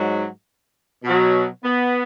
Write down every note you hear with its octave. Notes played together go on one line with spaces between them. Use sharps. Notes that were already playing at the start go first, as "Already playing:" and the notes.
Already playing: G#2 F#3
B2 F#3
B3